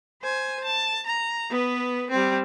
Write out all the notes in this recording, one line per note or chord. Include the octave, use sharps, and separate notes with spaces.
C5 G#5
A5
A#5
B3 B4
G3 C4